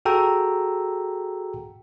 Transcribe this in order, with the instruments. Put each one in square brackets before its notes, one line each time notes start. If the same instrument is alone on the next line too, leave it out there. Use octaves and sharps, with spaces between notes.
[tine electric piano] F#4 G#4 A4 G5 A#5 E6